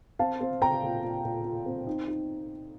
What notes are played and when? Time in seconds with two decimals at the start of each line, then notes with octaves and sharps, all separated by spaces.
0.19 C4 F5 A5
0.41 C4
0.62 C4 G5 A#5
0.83 A#2
1.03 A#2
1.24 A#2
1.45 A#2
1.66 C4
1.87 D#4
2.08 D#4